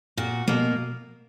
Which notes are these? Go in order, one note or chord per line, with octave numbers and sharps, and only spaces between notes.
A#2 F#4
B2 A#3